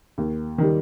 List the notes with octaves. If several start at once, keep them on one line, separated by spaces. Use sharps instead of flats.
D#2
D#3 G3